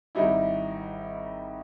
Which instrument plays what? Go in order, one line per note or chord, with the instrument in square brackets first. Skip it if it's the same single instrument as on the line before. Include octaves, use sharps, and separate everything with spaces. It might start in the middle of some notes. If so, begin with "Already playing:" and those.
[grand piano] G#1 G3 D#4 E4